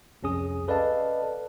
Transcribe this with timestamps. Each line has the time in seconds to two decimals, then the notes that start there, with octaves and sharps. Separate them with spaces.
0.23 C2 F2 C#4 G#4 D#6
0.68 A4 B4 D5 D#5 F5 A5